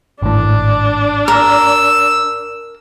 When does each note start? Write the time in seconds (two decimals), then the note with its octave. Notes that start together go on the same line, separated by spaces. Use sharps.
0.22 G#1 A2 D4
1.28 A#4 E6